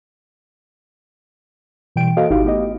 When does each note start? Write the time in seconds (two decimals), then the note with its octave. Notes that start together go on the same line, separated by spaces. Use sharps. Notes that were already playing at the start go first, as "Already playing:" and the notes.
1.96 B2 E3 G3 G5 D7
2.17 A#3 F#4 A4 C5 D#5 F5
2.30 G#1 D#4 E4 F#4 G4 F5
2.45 A3 B3 G4 D#5